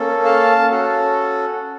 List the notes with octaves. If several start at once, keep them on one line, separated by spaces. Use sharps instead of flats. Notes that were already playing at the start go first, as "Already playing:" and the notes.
Already playing: A#3 C#4 A4
F5 A5
C#4 F#4 A4